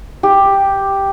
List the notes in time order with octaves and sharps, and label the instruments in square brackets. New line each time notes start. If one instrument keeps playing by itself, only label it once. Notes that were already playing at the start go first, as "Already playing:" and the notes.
[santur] G4